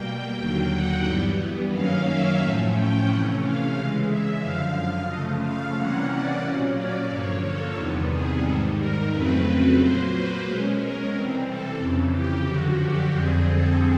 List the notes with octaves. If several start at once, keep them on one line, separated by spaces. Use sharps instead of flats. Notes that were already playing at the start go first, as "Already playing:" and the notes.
Already playing: B2 G3 A#3 G5
D#2 D3 F#3 A#3 G5
F#5
G2 E3 G3 B3
F#2 D#3 F#3 A#3 C#4 F5
E5
A2 F3 A3 C#4 E5
G5
C3 E3 A3 C#4 F#5
F5
C#3 E3 G#3 F5
E5
F#2 D3 F3 F5
C#3 F3 A3 D#5
F5
C3 E3 G3 A#3 C#4 F#5
D5
A#2 F#3 A#3 C#4
D5
G2 D3 F3 A#3 C#5
A4
E2 C3 D#3 G3 B3
G#4
G#2 D#3 G3 A4
A#4
F2 C#3 F#3 A3 C4 B4
A#2 F#3 A#3 C5
B4
B2 G#3 C#4 A#4
A#4
C3 E3 G3 C4
A4
F2 C#3 E3
G4
F#2 D3 F3 F#4
G4
F2 D3 G3 C4 G#4
A4